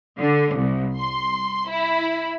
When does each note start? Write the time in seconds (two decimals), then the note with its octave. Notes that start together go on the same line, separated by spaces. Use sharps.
0.19 D3
0.56 C2
0.98 C6
1.69 E4